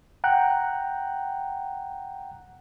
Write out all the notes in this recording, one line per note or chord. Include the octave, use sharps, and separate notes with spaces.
F#5 G5 A#5 F#6